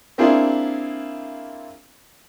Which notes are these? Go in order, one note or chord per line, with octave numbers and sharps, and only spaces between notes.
A#3 C4 D4 E4 F4 G#4